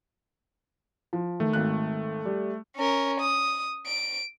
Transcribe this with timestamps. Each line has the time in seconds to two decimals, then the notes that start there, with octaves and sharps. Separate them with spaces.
1.13 F3
1.40 D#3 A3
1.53 G#1 D#3 F#6
2.25 G3
2.77 C#4 A#4
3.20 D#6
3.86 D7